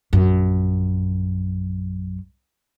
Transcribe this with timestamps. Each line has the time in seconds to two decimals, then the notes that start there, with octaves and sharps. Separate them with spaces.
0.13 A#1 F#2